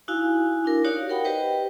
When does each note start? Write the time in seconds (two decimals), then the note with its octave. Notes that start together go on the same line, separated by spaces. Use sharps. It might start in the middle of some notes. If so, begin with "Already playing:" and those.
0.08 D#4 E4 F#4 F5 G#5
0.65 D4 E4 A#4
0.84 D#4 F#4 G4 C#5 D5 F5
1.10 A#4 F#5 G5 B5
1.25 G4 B4 C5 D#5 G5